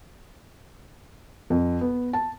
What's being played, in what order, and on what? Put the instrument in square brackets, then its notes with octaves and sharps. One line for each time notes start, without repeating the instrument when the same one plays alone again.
[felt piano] F2
B3
A5